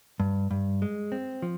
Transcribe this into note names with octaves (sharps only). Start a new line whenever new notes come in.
G2
G2
G#3
C4
F3